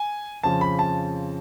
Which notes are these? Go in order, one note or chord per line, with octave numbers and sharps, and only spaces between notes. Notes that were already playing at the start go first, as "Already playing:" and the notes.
Already playing: G#5
F2 C#3 F3 A5
B5
A5